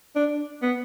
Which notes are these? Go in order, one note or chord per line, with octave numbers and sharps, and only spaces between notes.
D4
B3